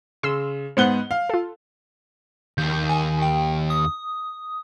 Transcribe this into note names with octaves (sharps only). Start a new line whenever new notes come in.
C#3 C6 E6
G#2 B3 C5 F#5 F#6 G7
F5
F4 A4
D#2 G6
G#5
G5
D#6